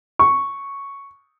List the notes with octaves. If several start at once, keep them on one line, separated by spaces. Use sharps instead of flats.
C#6